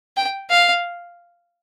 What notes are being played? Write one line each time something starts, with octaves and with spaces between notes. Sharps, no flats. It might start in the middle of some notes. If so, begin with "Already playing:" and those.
G5
F5